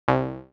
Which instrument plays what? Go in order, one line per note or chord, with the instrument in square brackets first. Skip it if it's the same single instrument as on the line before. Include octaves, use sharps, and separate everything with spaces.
[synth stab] C2